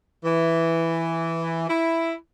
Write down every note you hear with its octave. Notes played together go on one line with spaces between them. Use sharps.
E3
E4